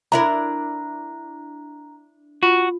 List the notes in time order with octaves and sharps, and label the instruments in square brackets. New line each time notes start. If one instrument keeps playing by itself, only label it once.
[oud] D4 E4 A#4 [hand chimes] A#5
[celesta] F4 [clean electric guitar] F#4